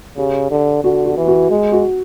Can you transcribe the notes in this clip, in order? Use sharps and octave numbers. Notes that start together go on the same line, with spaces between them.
C#3 G4
D3
D3 F#4
F#4
E3
F#4
G#3
F#4